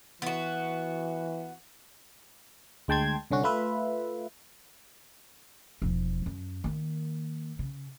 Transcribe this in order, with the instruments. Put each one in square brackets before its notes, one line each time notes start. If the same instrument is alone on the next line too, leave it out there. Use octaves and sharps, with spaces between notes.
[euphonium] E3 [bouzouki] B3 F#4
[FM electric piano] D2 G#3 G5 A5 C6 G#6
C2 D3 C#4 F#4
A3 F4 B4 E5
[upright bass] E1 F3
F#2
D#3 A#3
C#3